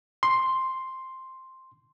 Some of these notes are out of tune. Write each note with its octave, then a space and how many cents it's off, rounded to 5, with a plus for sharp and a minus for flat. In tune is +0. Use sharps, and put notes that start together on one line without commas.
C6 +5